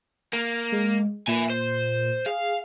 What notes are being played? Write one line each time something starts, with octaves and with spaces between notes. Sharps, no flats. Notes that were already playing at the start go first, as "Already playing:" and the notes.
A#3
G#3
A#2 E5 G#5
C5
G#4 F5